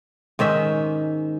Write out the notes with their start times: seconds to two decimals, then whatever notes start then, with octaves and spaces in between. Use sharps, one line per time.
0.39 G#2 D#3 C#4 E5